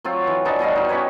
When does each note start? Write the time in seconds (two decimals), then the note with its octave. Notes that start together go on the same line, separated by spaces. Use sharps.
0.04 F#3 C4 F4
0.27 E3
0.45 E3 D4 D#4 A5
0.59 B2 G3 D#5 F5
0.76 D#4 F#4
0.89 C#4 G4 B4 C#5